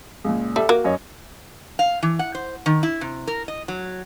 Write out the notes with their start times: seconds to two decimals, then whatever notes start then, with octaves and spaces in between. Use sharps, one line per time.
0.24 C#2 A#2
0.56 G3 A4 E5
0.69 A#3 F#4
0.84 F#2 C#5 D#5
1.79 F5
2.03 E3
2.19 F#5
2.35 C5
2.66 D#3
2.83 E4
3.01 C3
3.27 A#4
3.48 D#5
3.68 F#3